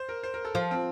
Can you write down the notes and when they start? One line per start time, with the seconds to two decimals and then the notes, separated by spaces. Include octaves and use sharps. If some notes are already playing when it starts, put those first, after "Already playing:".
Already playing: C5
0.09 A#4
0.23 C5
0.34 A#4
0.45 A4
0.55 F3 F4
0.71 C4